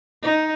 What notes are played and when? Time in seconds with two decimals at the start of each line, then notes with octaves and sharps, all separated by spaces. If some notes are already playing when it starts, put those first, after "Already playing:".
0.23 D#4